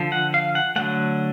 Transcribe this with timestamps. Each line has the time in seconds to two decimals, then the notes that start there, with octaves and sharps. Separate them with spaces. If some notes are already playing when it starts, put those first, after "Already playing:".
Already playing: D3 F3
0.12 F#5
0.34 F5
0.55 F#5
0.76 D3 F#3 A3 F#5